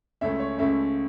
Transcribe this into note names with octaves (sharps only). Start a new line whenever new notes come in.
C#2 C#3 A3 C#4 E5
C#5
C#2 C#3 A3 C#4 E5